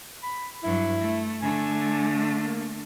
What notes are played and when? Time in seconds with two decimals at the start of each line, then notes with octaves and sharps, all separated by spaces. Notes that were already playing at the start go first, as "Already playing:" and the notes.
0.23 B5
0.64 G2 F#3 E4
1.01 A3
1.42 D3 A3 G#5
2.40 A#3